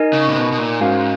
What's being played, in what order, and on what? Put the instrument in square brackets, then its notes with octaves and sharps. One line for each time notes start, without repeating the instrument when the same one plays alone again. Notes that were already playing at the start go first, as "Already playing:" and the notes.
Already playing: [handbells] D#4 A#4 D#5 G#5
[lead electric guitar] C#3
A#2
B2
B2
A#2
[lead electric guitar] G#2 [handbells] C#4 F#4 A#4 F5 G#5